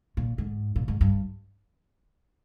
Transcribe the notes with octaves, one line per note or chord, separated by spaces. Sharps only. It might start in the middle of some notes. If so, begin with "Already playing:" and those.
A#2
G#2
A#2
G#2
G2